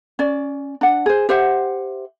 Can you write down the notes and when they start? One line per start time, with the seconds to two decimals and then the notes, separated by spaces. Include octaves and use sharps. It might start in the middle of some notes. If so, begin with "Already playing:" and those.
0.19 C#4 D5
0.81 D4 F#5
1.06 G#4 C5
1.29 G4 C5 E5 F#5